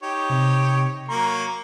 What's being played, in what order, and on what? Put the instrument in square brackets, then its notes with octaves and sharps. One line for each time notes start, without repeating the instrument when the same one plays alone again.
[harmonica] D#4 G4 C#5
[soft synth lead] C3
[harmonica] F#3 A#3 C#6 [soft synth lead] A#5